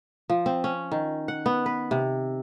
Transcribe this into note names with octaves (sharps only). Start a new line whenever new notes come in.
F3
C4
C#4
D#3
F#5
B3
B4
C3